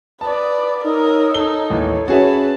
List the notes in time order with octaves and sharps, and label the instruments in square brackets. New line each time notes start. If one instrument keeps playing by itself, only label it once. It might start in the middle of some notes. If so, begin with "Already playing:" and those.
[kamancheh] B4 D5 [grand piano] A5 [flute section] D#6
[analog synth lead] D#4 [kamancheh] A#4 [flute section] C#5 D#6 E6
[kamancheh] D#4 [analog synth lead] A4 [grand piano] G7
[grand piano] A1 D#2 [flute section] C#5
[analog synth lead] C#4 [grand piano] F#4 G#4 E5 [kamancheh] B4 A5